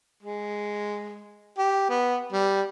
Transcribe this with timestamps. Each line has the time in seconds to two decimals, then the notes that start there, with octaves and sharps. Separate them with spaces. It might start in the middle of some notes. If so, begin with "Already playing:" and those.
0.23 G#3
1.58 G4
1.90 B3
2.32 G3